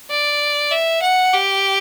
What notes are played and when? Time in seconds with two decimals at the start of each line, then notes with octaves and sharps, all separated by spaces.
0.11 D5
0.71 E5
1.02 F#5
1.33 G4